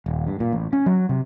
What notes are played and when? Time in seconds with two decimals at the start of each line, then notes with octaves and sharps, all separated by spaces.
0.06 D#1
0.27 G2
0.40 A#2
0.53 A1
0.73 C#4
0.86 F#3
1.09 C3